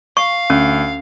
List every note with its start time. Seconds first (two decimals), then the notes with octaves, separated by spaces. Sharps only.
0.17 F5 C#6
0.50 D2 C#4